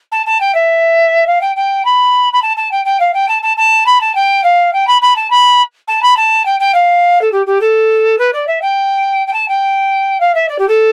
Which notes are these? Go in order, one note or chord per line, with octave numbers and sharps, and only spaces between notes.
A5
A5
G5
E5
F5
G5
G5
B5
B5
A5
A5
G5
G5
F5
G5
A5
A5
A5
B5
A5
G5
F5
G5
B5
B5
A5
B5
A5
B5
A5
G5
G5
F5
A4
G4
G4
A4
B4
D5
E5
G5
G5
A5
G5
F5
E5
D5
G4
A4